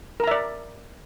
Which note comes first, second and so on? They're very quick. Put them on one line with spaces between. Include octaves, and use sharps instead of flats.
A#4 A#5 E5 D5